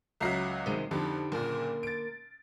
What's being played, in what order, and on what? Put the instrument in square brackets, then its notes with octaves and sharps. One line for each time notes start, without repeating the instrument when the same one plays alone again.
[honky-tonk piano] C#2 F#3 F#4 [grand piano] E5 A#5 C7
[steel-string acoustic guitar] C3 D#3 G#3
[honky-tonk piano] F2 [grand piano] D3 [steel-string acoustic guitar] D#4 G4 A4
[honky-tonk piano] F#1 A#2 [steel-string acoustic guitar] A#3 A#4
[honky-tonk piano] A6 D7